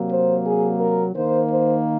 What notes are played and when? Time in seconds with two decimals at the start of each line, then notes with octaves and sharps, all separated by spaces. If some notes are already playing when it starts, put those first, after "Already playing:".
Already playing: C3 F#3 A#3
0.10 C5
0.44 G#4
0.80 A#4
1.14 D#3 A#3 C5
1.50 C5